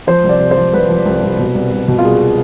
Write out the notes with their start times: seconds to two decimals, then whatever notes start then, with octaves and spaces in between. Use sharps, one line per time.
0.07 F3 C5
0.24 C2
0.29 D5
0.40 C3
0.51 C5
0.57 F3
0.73 C2 B4
0.89 F3
1.05 C2
1.23 C2
1.39 B2
1.55 C2
1.71 C2
1.88 B2
1.99 F4
2.04 C2 G#4